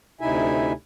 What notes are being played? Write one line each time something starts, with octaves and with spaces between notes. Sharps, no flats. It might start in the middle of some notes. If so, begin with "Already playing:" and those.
D2 C3 D#4 E4 E5 G#5